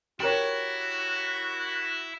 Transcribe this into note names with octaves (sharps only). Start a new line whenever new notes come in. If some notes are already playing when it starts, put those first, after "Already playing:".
E4 F#4 G4 A#4 C#5